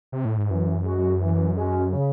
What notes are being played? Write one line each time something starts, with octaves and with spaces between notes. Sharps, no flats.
C3
A2
G#2
F#2 E3
G#3 C#4 F#4
E3
G#3 C#4 F#4
C#3